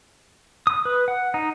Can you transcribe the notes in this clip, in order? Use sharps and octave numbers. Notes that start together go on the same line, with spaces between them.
D#6
B4
F#5
D#4